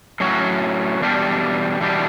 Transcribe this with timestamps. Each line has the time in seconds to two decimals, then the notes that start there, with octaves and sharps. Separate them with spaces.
0.20 A2 F#3 C#4 F#4
1.00 E2 B2 G3 D4 G4
1.80 E2 B2 G3 D4 G4